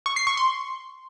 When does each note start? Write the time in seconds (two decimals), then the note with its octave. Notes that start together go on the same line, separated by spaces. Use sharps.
0.06 C#6
0.16 C7
0.27 C#6
0.37 C6